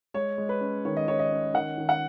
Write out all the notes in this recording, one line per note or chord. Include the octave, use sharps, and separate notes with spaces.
G#3 C#5
G#3
B4
C#4
D#3 C#5
D#5
D#3 C#5
D#5
C#4
D#3 F#5
D#3
F#5